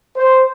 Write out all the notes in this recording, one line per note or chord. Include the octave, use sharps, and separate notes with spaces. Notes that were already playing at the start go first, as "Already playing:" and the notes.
C5